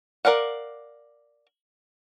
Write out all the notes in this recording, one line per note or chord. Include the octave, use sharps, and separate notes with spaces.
A#4 D5 F5 F#5